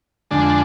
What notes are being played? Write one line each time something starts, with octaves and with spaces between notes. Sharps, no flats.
F2 D3 G#3 D4